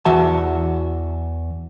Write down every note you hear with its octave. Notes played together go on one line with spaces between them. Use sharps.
E2 E3 F#4 E5 A5